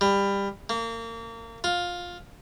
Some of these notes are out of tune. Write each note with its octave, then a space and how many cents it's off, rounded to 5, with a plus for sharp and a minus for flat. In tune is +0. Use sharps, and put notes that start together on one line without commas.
G3 +20
A#3 -30
F4 +15